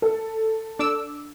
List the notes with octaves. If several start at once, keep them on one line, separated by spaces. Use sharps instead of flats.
A4
D4 D6 E6